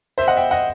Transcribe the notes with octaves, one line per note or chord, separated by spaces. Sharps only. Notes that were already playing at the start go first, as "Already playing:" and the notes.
C5 E5
D#5 F#5
E5 G5
D#5 F#5